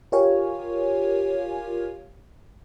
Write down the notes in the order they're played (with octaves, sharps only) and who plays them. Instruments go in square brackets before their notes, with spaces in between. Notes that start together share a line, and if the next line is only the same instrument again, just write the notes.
[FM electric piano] F4 G4 A#4 C#5 F5 G#5